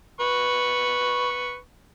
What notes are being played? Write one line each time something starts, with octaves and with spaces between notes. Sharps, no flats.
B4 C#6